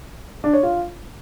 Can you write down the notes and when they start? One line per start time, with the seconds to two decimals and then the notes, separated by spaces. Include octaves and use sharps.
0.44 D4
0.53 C#5
0.63 F4